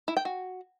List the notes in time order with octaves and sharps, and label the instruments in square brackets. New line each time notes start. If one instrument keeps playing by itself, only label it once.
[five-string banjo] E4
G5
F#4